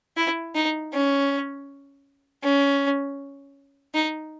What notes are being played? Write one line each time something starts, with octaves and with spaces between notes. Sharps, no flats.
E4
D#4
C#4
C#4
D#4